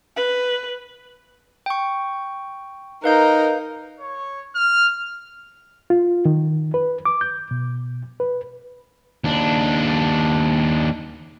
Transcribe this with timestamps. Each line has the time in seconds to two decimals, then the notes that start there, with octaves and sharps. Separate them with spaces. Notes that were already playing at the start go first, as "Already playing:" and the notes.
0.17 B4
1.66 G5 C#6
3.04 D#4 A#4 B4 F5 G6
4.00 C#5
4.55 F6
5.90 F4
6.25 D#3
6.74 B4
7.05 D6
7.21 G6
7.51 B2
8.20 B4
9.24 D#2 D4